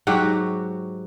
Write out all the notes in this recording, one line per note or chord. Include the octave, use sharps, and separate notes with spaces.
G#2 F#3 F#4 G4